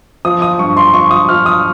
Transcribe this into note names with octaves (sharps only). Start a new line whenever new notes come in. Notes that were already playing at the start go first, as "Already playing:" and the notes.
F3 D#6
D#6
G2 C#6
C6
F3 C#6
D#6
F3 F6
D#6